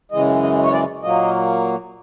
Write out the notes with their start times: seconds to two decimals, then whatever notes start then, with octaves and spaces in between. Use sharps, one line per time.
0.12 F#2 C#3 E3 G#3 D#5
0.42 D#5
0.63 C#5
0.72 D5
1.02 A#2 F#3 A#3 D#5